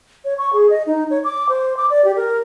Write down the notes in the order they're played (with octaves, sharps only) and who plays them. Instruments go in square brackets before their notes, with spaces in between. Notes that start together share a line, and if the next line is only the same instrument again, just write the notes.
[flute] C#5
C#6
G#4
D#5
D#4
C#5
D6
C5
D6
D5
G4
A#4